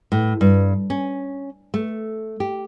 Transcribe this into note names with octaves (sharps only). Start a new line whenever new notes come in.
A2
G2
C#4
A3
G4